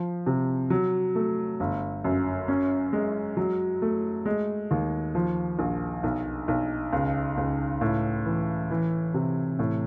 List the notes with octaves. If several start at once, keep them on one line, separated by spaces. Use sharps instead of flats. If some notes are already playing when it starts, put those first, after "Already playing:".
Already playing: F3
C3
F#3
A3
G1
F#2
C#4
G#3
F#3
A3
G#3
D#2
F3
A#1
B1
B1
C#2
C#2
A2
E3
E3
C3
A2